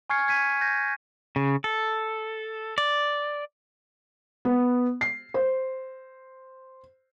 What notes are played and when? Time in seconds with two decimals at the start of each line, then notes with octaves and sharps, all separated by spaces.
0.10 G#5 C#6 F6 G#6 C7 C#7
0.28 G#6 B6 D#7
0.61 G6 G#6 A#6
1.36 C#3
1.64 A4
2.78 D5
4.45 B3
5.01 C7
5.34 C5